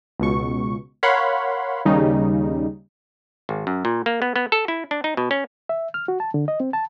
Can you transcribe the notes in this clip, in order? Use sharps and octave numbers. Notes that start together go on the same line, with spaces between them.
C#2 B2 C#6
A#4 C#5 F5 F#5 B5 C6
D#2 C#3 G3 D#4
G#1
F#2
A#2
A#3
B3
B3
A4
E4
D4
D#4
B2
C#4
E5
F6
F#4
A5
D3
D#5
C4
A5